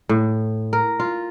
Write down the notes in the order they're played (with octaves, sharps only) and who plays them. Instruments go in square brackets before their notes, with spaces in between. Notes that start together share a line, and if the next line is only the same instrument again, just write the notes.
[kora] A2
A#4
F4